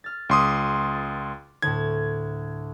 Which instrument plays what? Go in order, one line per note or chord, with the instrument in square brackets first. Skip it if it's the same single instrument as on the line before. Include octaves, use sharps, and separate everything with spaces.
[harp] F6 A6
[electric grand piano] C#2 C6 D#6 [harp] D6 B6
[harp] A6
[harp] D2 A2 [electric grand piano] G#6